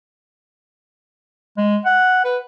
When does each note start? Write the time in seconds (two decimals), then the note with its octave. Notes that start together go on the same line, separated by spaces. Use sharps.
1.57 G#3
1.86 F#5
2.25 B4